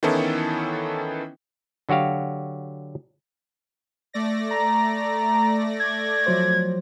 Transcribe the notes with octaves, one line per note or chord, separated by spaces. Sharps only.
D#3 E3 B3 C#4 E4 A4
D3 F#3 F#4 G4 F5
A3 D5 A#6
A#5
G#6
F3 F#3 C5